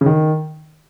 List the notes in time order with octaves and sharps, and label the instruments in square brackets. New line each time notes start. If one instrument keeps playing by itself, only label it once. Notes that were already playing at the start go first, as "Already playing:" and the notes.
[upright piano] C#3
D#3